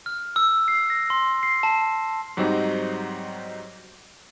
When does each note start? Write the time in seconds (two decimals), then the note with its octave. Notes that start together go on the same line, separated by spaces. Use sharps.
0.06 F6
0.36 E6
0.68 C7
0.90 A#6
1.10 C6
1.43 C7
1.63 A5
2.37 G#2 F#3 G3 C4 D#4